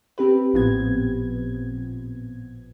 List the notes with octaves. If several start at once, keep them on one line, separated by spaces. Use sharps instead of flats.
C4 G4 B4
A1 A#2 F3 B3 C4 G#6